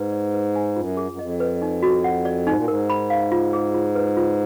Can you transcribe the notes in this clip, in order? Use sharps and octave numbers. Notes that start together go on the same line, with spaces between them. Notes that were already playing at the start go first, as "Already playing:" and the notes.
Already playing: G#2 B4
D5
B4
G#5
F#2 F4
G#4
F#2
F2 D#5
B4
D#4
F#4
F#5
D5
G#2 D#4
A#2
G#2 A#4
B5
F5
F4
G#4
F4
B4
F4